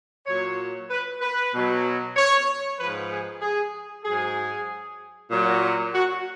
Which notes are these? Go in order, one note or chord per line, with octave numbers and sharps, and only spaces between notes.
A#2 F#3 C#5
B4
B4
B2 F#3
C#5
G#2 F3 B4
G#4
G#4
G#2 F#3 G#4
A#2 F#3
F#4